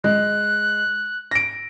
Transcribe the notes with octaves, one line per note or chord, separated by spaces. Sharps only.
G#3 F#6
A#6 D7